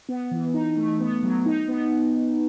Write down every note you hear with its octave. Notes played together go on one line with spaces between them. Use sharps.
B3
E3
D#4
A3
B3
F#3
D#4
B3